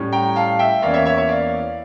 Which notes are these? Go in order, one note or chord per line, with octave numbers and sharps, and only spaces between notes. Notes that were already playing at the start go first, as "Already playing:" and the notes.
Already playing: A2 G3 C#4
G5 A#5
F5 A5
E5 G5
E2 E3 A#3 C#4 D5 F5
C#5 E5
C#5 E5
C#5 E5
D5 F5